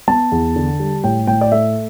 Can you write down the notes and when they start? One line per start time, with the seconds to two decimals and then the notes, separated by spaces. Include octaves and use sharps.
0.08 B3 A5
0.32 E2
0.56 D3
0.80 G3
1.04 A2 G5
1.27 A2 G5
1.41 D5
1.52 A3 E5